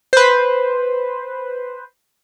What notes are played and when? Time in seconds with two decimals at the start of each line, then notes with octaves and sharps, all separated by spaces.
0.13 B4 C5